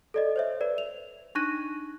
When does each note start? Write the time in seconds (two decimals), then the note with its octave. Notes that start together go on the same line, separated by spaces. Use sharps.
0.14 A4 D5 D#5
0.36 C5 C#5 E5
0.61 B4 D5
0.78 F7
1.35 D4 D#4 C#6 F#6 A#6 D#7